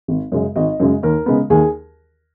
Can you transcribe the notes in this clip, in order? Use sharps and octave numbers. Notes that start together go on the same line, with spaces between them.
G#1
F#2 C#3 G#3
G#1 D#5
F#2 C#3 G#3
D#2 A#4
C#3 G#3 B3
D#2 G#4